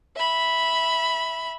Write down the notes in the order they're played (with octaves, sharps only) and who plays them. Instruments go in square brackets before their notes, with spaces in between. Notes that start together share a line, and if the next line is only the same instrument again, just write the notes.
[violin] E5 B5